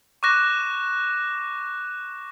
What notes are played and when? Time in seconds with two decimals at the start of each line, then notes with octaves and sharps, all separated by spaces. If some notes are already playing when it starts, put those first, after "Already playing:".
0.23 C#6 D6 F#6 A#6 E7